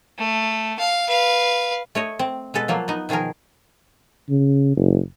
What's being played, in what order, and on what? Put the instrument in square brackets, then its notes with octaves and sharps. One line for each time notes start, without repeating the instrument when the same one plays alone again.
[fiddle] A3
F5
B4 F5
[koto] A3 C#5 D#5
C4
B2 G#3 A4 B4
F3 F#3 A#3 F4
B3 D#4
B2 D#3 F3 G#4 A#4
[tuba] C#3
F#1